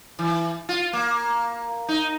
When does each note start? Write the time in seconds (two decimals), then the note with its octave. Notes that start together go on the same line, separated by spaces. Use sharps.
0.19 E3
0.69 F4
0.93 A#3
1.88 D#4